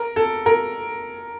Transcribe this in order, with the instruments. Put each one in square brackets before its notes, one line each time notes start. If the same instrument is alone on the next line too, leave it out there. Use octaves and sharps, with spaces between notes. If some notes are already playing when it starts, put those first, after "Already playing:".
Already playing: [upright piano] A#4
A4
A#4